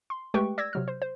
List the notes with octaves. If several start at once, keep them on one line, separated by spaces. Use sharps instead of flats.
C6
G#3 A3 G4 B4 G5 C#6
D5 E6 G#6 A#6
C3 F#3 F6
C5
C5